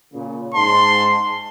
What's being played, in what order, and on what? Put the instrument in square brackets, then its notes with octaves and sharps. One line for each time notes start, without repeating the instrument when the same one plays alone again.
[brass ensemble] A#2 C#3
[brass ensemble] G#2 A5 [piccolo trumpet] C6